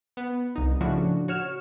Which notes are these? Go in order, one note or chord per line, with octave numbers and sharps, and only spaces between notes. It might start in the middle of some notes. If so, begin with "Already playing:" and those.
B3
C2 D#4
A2 C#3 F3 D4 F#4
F#4 C#5 F6 E7